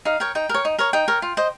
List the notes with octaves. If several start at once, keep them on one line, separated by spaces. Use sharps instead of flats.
D#4 F5
A#4 C#5 G5
D#4 G5
A#4
C#5
D#4
A#4 C#5
D#4 G5
A#4 C#5
F4
C5 D#5